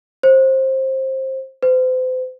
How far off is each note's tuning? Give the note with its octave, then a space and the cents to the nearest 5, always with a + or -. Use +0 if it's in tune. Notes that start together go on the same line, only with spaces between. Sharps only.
C5 +20
C5 -40